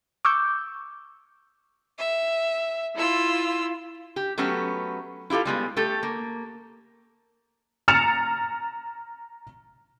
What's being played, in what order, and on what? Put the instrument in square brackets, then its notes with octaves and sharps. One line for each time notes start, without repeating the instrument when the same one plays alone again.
[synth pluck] C#6 D6 E6 G6
[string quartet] E5
E4 F4 E6
[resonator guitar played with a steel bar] G4
F#3 A3 B3 C#4 G4
E4 F4 G4 A4 F5
G3 G#3 B3
A3 G4 A4
A#3
[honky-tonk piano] A#5 F6 A6 C#7 E7 F7